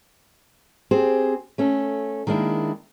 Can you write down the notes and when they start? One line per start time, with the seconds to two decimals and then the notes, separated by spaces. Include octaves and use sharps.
0.91 C4 G4 G#4 C5
1.58 A3 C#4 A4
2.27 D#3 G#3 A#3 D4 E4